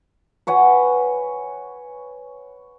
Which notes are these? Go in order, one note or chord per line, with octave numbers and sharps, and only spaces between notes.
B4 C#5 F#5 G#5